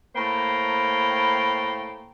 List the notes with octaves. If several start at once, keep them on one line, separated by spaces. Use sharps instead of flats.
A2 A#3 C5 G5 A#5